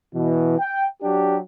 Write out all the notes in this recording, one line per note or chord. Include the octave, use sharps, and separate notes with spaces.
B2 E3
G5
F#3 D4 G4